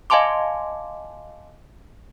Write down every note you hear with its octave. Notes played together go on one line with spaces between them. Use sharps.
D#5 F5 G#5 A5 C6 D6